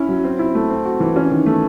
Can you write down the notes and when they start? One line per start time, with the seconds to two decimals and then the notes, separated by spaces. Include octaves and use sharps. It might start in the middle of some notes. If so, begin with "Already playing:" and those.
Already playing: C#4 E4
0.08 F#3
0.24 C4
0.39 E4
0.55 A3
0.70 C4
0.85 F#4
1.00 E3
1.16 C#4
1.31 D#3
1.46 A3